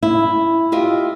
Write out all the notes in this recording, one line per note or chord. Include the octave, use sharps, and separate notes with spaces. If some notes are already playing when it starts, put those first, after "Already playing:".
E4
F4 G4 D#5 E5